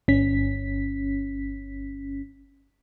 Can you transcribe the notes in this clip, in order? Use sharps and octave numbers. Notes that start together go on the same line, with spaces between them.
G1 C#4 B6